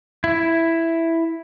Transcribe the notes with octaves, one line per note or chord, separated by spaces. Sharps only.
E4